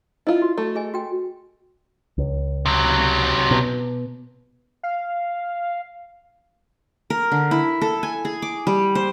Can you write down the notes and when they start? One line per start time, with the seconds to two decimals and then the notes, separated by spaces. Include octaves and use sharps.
0.27 E4 F4 D#5
0.42 F#4
0.58 A3
0.75 G#4 D#5 G#5
0.94 F#4 G5
2.18 C#2
2.66 C3 F#3
3.51 B2
4.83 F5
7.10 A#4
7.32 D3
7.51 E4
7.82 A4
8.03 G#5
8.25 G#4
8.42 D6
8.67 G3
8.95 C5